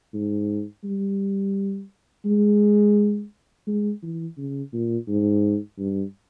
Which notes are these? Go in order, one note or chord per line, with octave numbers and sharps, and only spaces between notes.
G#2
G3
G#3
G#3
E3
C#3
A#2
G#2
G2